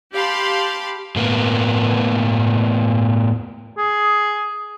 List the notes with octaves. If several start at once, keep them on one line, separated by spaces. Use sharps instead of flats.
G4 F5 A5 B5 C6
A2 A#3 B3
G#4